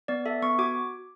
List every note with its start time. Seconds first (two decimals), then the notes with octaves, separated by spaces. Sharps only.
0.08 B3 D5
0.26 A4 E5
0.42 B3 C#6
0.59 F#4 D6